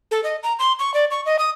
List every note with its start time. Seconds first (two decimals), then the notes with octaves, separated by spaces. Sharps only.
0.11 A4
0.24 D#5
0.43 A#5
0.59 C6
0.79 C#6
0.94 D5
1.11 C#6
1.26 D#5
1.39 D#6